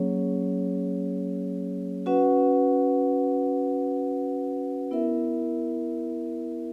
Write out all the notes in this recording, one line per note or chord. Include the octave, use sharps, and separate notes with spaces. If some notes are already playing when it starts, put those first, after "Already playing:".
Already playing: F#3 A#3 C#4 G#4 C#5
C#4 F#4 B4 F#5
B3 E4 A#4 E5